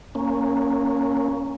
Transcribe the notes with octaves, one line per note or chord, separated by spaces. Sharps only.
A#3 C#4